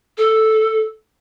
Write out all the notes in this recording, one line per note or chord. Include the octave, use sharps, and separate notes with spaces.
A4